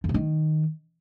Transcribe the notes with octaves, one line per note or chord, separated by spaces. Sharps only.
F2
C3
D#3